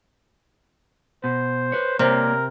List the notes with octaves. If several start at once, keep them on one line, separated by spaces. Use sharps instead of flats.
B2 C5
B4 C#5
C3 A#3 A#4 C#5 D5